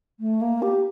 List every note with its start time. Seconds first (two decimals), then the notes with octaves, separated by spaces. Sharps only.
0.20 A3
0.41 A#3
0.62 G4